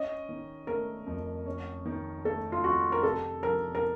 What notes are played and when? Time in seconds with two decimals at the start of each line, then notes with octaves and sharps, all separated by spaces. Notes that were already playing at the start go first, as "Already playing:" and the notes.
Already playing: C#4 D#5
0.29 D#3
0.67 A3 A#4
1.06 F2
1.46 C#4
1.85 D#3
2.25 A3 A4
2.52 F4
2.64 F2 F#4
2.92 A#4
3.03 C3 A4
3.43 F3 A#4
3.75 A#4